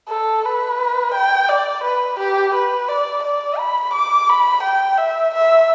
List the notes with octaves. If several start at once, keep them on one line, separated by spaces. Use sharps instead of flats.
A4
B4
G5
D5
B4
G4
B4
D5
D5
B5
D6
B5
G5
E5
E5